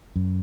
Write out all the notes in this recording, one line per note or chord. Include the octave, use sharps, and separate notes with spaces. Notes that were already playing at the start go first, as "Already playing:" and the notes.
F#2